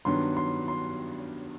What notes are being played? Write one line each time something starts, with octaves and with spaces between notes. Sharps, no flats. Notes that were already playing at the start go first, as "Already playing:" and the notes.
G2 D#3 F#3 B3 D4 C6
C6
C6